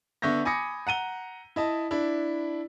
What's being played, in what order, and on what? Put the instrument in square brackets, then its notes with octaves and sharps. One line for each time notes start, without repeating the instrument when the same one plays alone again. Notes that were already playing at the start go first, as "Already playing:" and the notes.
[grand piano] D3 B3 E5 C#6 G6 A#6
G#5 B5 D6 D#6 A#6 C#7
F#5 A#5 D#7 G7
E4 D#5 A5
D4 E4